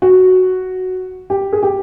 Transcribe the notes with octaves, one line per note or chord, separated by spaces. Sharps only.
F#4
G4
G#4
G4